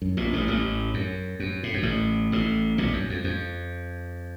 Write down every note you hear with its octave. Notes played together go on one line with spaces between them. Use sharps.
F#2
A#1 A#2
A1 A2
A1 A2
F#2
F#2
A2
F#2
A1 A2
A1 A2
A#1 A#2
F#2
F2
F2